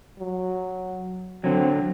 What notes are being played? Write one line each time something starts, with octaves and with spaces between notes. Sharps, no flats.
F#3
D3 F#3 C4